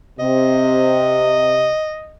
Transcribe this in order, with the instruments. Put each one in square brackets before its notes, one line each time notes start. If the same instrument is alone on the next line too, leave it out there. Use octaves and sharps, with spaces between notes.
[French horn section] C3 [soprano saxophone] D#5